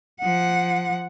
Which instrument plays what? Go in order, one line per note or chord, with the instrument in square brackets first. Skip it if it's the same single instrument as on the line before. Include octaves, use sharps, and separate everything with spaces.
[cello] F3 F#5